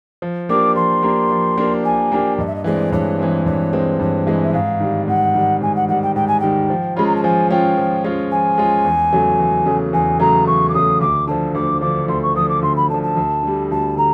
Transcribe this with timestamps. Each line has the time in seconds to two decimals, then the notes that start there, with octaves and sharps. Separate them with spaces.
0.22 F3
0.49 A#3 D4 G4 A#4 D6
0.76 F3 C6
1.03 A#3 D4 G4 A#4
1.31 F3
1.57 A#3 D4 G4 A#4
1.84 F3 G#5
2.12 A#3 D4 G4 A#4
2.38 G2 D#5
2.46 E5
2.55 D#5
2.64 E3 G#3 C4 D5
2.92 G2 C#5
3.19 E3 G#3 C4
3.46 G2 C#5
3.73 E3 G#3 C4
3.99 G2 C#5
4.26 E3 G#3 C4 D#5
4.43 E5
4.53 G#2 F5
4.80 D#3 G3
5.08 G#2 F#5
5.35 D#3 G3
5.61 G#2 G#5
5.75 F#5
5.88 D#3 G3 F#5
6.02 G5
6.15 G#2 G5
6.27 G#5
6.40 D#3 G3 G5
6.70 F3
6.97 G#3 C#4 F4 B5
7.06 A#5
7.15 A5
7.23 F3 G#5
7.50 G#3 C#4 F4 G5
7.78 F3
8.04 G#3 C#4 F4
8.31 F3 G#5
8.58 G#3 C#4 F4
8.85 E2
9.13 C#3 F#3 A3
9.39 E2
9.65 C#3 F#3 A3
9.93 E2 G#5
10.20 C#3 F#3 A3 A#5
10.47 E2 C#6
10.69 D6
10.74 C#3 F#3 A3 D#6
11.01 D2 D6
11.27 D3 F3 A5
11.55 D2 D6
11.81 D3 F3 D6
12.08 D2 C6
12.22 C#6
12.36 D3 F3 D#6
12.49 D6
12.62 D2 C6
12.76 B5
12.89 D3 F3 A5
13.03 A5
13.17 D2
13.43 D3 G3
13.71 D2 A5
13.97 D3 A#5